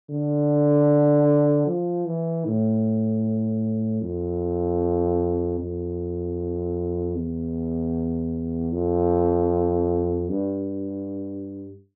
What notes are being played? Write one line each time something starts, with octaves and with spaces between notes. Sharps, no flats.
D3
F3
E3
A2
F2
F2
E2
F2
G2